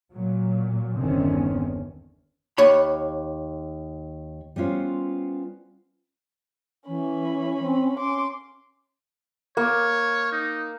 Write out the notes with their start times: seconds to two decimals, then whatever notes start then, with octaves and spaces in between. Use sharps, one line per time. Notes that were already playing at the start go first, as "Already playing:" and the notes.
0.12 A#2 F#3
0.95 G1 E2 D3 D#3 C4 C#4
2.58 D#2 C#5 B5
4.56 G3 B3 C#4 F4 C5
6.87 E3 C#4 B5
7.62 C4
7.98 C#4 C6 D6
9.57 A#3 C#5
10.32 D#4